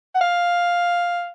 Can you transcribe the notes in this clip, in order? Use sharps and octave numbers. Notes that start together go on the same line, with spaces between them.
F#5
F5